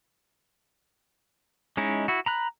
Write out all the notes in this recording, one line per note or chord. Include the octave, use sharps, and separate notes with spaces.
G#3 C#4 D#4 E4
E4 F#4
A#5 B5 F#6